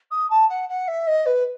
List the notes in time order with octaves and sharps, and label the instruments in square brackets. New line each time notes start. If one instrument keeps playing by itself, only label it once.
[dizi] D#6
A5
F#5
F#5
E5
D#5
B4